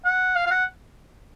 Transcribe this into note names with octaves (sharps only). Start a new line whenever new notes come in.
F#5
F5
F5
F#5